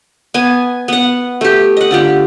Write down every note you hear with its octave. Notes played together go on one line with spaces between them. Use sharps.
B3 G#5
B3 F#5
A3 G4
D#5 F#5
D3 F4 G4